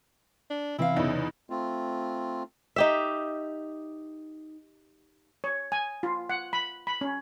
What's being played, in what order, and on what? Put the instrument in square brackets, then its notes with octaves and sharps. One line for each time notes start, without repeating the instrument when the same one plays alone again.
[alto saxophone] D4
[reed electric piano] C3 E3 [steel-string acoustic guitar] C4 F5 [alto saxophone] E4
[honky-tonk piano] E2 C#3 [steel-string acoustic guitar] D#4
[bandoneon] A3 C4 F4
[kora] D#4 G4 E5
[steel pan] C#5
G#5
F4
F#5
B5
B5
C#4